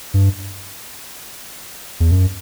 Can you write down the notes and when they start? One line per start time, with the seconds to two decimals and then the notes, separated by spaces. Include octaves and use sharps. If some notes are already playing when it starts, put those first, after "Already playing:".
0.14 G2
2.00 E2
2.11 F#2